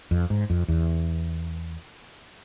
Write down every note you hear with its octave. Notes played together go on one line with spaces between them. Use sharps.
F2
G#2
F2
E2